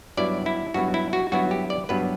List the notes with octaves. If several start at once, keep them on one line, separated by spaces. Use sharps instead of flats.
G2 F#3 B3 E4 D5
E4
G2 F#3 B3 E4 F#4
E4
F#4
G2 F#3 B3 E4 F#4
G4
D5
G2 F#3 B3 E4 B4